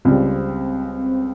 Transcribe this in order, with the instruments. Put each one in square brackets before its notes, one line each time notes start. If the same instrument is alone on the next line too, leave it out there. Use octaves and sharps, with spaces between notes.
[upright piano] C#2 C#3 G3 [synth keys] C4